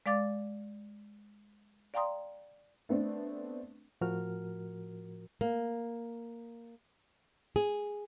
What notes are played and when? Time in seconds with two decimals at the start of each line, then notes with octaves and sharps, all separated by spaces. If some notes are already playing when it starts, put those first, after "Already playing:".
0.06 G#3 D5 F5 D6 A6
1.94 D5 F5 G5 A#5 C6 D#6
2.89 A3 B3 C4 D4
4.01 A2 F3 F#4 A#4 F6
5.41 A#3
7.56 G#4